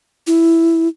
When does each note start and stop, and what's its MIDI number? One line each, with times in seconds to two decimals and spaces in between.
0.27 0.88 64